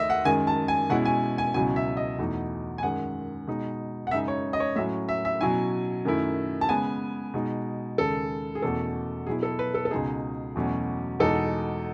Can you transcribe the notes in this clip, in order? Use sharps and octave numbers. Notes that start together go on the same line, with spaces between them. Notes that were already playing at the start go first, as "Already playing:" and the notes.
Already playing: D#2 D#3 A3 D#5 E5
F#5
F#2 D#3 G#3 G#5
A5
G#5
B2 G#3 C#4 E4 F#5
G#5
G#5
C#2 B2 F#3 C#4 E4 G#5
E5
D#5
E2 B2 A3 D#4
G#5
F#2 D#3 G#3 F#5
B2 G#3 D#4
F#5
F#2 C#3 G#3 D#4 E5
C#5
D#5
C#5
A2 F#3 C#4 E5
E5
E5
B2 F#3 C#4 E4 G#5
F#2 D#3 A3 E4
A5
C#3 G#3 B3 G#5
B2 G#3 D#4
D#2 C#3 G#3 A4
G#4
E2 B2 A3 C#4 A4
B2 F#3 B3 E4 G#4
A4
B4
A4
A4
C#2 B2 G#3 D#4 G#4
E2 B2 F#3 A3 C#4
E2 B2 G#3 D#4 A4